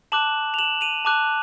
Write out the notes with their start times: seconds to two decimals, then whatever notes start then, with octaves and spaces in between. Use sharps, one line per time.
0.12 A5 D6 F#6 E7 F#7
0.54 F7
0.59 E7 F#7
0.81 D#7 F7
1.05 A5 D6 F#6